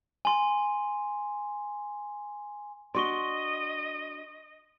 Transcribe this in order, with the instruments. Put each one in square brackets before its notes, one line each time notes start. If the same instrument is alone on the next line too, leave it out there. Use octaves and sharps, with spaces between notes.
[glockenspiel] G#5 C6
[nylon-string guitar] D4 F#4 D5 [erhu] D#5 [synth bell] C6 C#6 G7